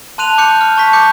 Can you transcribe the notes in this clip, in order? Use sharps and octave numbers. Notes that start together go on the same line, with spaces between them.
A5 C6 F#6 D#7 F7
D6 F#6 G6 C#7
F6
A5 C#6 G6 B6
D6 G6 C#7